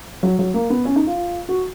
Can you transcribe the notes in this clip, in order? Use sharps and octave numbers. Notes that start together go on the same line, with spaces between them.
F#3
F#3
A#3
B3
C#4
D#4
F4
F#4